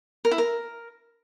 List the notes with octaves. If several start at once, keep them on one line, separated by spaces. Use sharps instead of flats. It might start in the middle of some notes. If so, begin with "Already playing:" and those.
A#4
E4
A#4